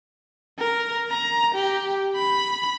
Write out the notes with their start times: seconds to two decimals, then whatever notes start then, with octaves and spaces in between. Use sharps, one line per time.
0.58 A#4
1.10 A#5
1.54 G4
2.16 B5